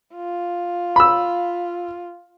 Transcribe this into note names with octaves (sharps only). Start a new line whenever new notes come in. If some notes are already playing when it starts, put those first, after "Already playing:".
F4
B5 E6